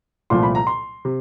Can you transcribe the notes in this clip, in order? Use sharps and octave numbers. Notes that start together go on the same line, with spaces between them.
C2 A#2 F3 A3 C6
B5
A#5
C6
C3